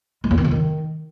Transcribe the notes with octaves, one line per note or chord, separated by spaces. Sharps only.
G#3
E2
D#3
C#3
D#3